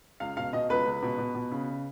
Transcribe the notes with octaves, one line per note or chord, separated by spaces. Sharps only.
C#2 F5
B2 F5
B2 D#5
C#2 B4
C#2
B2
B2
B2
C#3